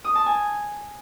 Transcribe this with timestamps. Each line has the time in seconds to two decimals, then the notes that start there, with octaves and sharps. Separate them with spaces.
0.04 D#6
0.15 A5
0.26 G#5